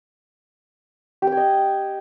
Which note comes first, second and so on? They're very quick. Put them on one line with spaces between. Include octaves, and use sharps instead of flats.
G4 G5 G#5 D#5